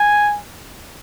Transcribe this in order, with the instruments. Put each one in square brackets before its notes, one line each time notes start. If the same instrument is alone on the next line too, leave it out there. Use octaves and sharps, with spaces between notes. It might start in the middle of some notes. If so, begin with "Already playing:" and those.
Already playing: [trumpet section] G#5